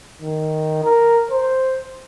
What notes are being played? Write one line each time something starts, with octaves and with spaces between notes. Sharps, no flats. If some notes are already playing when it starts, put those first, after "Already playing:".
D#3
A#4
C5